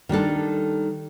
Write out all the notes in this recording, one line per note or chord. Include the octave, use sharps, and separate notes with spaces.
D#3 G3 D4 A4